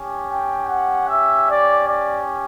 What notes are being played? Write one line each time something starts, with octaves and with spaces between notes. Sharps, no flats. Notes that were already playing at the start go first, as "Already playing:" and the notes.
Already playing: C#4 G4
G5
F#5
E5
D5
D5